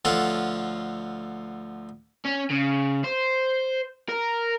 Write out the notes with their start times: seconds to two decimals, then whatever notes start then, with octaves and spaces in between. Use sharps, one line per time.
0.05 D2 F3 F4 A4 C#5 F#5
2.25 C#4
2.50 C#3
3.04 C5
4.09 A#4